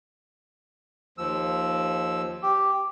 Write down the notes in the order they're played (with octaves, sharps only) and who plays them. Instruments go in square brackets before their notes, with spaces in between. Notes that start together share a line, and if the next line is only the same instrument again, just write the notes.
[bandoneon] D#2 F3 E6
[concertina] G4